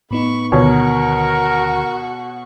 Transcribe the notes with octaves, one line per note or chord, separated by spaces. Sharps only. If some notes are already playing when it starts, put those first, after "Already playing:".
A2 B3 D#4 B5 C#6
D2 B2 D3 D#3 F#4 A#4 C#5 C#6